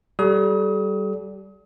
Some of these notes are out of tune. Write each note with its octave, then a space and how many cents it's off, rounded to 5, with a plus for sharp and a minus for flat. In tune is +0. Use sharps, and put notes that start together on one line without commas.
G3 -20 A4 -35 D#6 +35